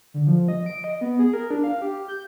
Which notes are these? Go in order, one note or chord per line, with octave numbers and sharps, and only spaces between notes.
D3
F3
D#5
D7
D#5
B3
G#4
A#4
D4
F5
G4
G6